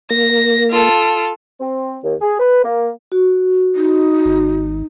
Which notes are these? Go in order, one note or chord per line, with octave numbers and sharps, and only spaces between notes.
A#3 A#6
F4 A4
C4
D#2
G#4
B4
A#3
F#4
D#4
G#1